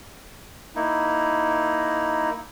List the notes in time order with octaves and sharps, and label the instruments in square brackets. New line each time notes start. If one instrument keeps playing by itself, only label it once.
[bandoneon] A#3 D#4 E4